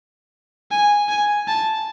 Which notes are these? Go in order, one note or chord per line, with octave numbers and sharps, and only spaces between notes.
G#5
G#5
A5